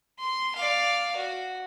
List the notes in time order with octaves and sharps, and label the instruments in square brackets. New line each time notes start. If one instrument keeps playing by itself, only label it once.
[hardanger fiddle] C6
D5 F5
F#4